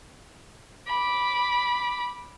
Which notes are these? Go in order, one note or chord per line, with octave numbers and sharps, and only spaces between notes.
B5 D6